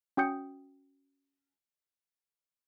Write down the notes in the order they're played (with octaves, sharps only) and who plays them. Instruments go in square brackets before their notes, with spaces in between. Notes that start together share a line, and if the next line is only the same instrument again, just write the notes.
[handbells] C#4 F#4 G5 D#6 G6 C#7